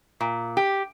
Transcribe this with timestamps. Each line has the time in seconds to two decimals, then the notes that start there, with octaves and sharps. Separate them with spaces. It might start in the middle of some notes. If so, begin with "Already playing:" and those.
0.21 A#2
0.57 G4